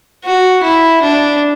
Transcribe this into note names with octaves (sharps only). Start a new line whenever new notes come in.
F#4
E4
D4